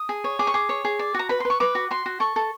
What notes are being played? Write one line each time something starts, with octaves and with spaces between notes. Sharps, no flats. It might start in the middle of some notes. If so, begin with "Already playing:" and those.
Already playing: D#6
G#4
C#5
G#4 D6
C#6
G#4 D6
C#5
G#4
D5
F#4 A#5
B4 B5
C6
B4
C#6
B4 D6
F#4
F#4 C6
F#4
A4 C#6
A4